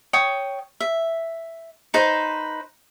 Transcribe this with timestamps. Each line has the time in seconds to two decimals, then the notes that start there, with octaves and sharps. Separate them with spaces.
0.13 C#5 G5 D#6
0.80 E5
1.94 D#4 B4 C5